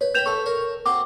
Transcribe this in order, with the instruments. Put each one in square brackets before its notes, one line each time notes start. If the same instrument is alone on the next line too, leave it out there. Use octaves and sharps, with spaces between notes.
[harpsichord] B4 [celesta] C#5
[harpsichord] B4 G5 B5 [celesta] G6 E7 F7
[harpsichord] E4 A4 [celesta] C#6
[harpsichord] A#4 C#5
[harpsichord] C4 F#4 C5 [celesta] D6